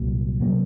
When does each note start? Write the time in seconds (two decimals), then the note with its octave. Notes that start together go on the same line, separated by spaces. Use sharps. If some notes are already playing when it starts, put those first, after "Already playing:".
Already playing: C2 A#2 F#3
0.40 C3 F#3 A#3